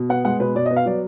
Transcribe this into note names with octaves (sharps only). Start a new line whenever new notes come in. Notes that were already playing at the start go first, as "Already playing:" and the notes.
Already playing: B2
B3 F#5
G#3 F#5
B2 B4
B2 D5
D#5
B3
F5
F#3 D5